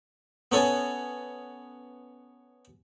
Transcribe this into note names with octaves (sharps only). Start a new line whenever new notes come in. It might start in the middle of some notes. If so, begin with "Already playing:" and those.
B3 C#4 A4 C#5 G#5